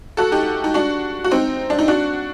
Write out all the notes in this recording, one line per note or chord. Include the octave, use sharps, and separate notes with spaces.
F#4 A4
D#4 G4
D#4
D4 F#4
F#4
C4 D#4
D4
D#4
D4 F#4